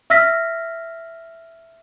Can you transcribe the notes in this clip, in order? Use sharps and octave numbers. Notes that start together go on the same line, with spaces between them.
E5 E6 F6 A#6 B6